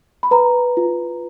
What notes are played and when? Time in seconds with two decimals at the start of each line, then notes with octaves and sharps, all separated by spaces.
0.23 B5
0.31 B4 A#5
0.77 F4